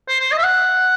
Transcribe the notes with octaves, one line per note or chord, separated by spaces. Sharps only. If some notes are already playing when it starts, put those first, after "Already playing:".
C5
C5
D#5
E5
F#5